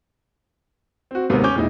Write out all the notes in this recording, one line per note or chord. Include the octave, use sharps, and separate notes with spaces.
C4 F#4
D#2 G#2 C3 A#3 B3
C#4 D6 G6
E1 A#2 D#4 E4